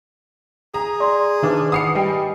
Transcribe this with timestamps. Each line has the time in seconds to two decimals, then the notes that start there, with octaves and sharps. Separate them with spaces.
0.74 G#4 A#5
1.00 D5 C6
1.43 D#3 D4 D#4 B4 C5
1.72 B4 F#5 B5 D#6 C7 C#7
1.95 G3 D#5 G5 G#5